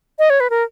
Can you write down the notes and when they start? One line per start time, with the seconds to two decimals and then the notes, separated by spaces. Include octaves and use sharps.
0.19 D#5
0.30 C#5
0.40 B4
0.50 A#4